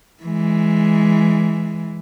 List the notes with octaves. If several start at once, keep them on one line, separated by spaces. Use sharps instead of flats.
E3 G#3